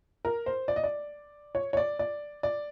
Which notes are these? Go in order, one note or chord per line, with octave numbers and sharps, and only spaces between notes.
A#4
C5
D5
D#5
D5
C#5
C#5
D5
D5
D5